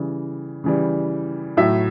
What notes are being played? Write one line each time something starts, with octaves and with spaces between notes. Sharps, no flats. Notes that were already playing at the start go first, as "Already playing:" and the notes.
Already playing: C#3 E3 G3
C#3 E3 G3
A2 F#3 E5